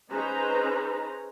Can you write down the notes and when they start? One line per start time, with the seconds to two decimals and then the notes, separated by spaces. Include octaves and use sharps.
0.10 C#4 D#4 G#4 B4 C5 A#5